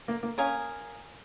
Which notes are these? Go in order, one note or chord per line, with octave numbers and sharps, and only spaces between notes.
A#3
A#3
C#4 A#4 F5 G#5 D#6